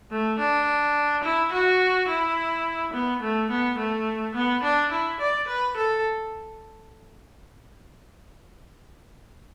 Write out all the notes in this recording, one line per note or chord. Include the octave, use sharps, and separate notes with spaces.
A3
D4
E4
F#4
E4
B3
A3
B3
A3
B3
D4
E4
D5
B4
A4